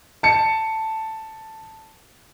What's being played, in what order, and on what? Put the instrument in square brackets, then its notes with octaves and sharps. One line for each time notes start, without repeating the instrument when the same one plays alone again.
[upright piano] A5 C#7